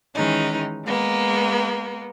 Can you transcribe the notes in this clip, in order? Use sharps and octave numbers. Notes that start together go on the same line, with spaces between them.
D#3 E3 G#3 C#4 D#4
G#3 A#3 B3